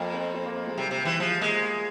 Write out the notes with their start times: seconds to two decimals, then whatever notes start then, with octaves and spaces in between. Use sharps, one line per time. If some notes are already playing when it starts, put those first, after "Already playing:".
Already playing: F2 A#3
0.14 C4
0.34 C4
0.46 A#3
0.56 A#3
0.67 G#3
0.78 C3 G3
0.91 C3
1.05 E3
1.19 F3 G#3
1.41 G#3 A#3
1.62 A#3